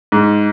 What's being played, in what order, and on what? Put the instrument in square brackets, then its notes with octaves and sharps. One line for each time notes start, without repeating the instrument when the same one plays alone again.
[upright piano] G#2